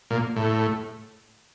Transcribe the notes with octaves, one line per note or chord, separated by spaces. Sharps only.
A#2
A2